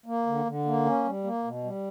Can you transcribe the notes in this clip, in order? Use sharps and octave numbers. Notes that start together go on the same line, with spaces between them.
A#3
D3
D3
A#3
C#4
G3
A#3
B2
G3